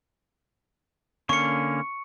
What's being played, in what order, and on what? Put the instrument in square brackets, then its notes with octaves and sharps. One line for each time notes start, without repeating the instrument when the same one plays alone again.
[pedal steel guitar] D3 A#3 C#4 [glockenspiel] C#6 C#7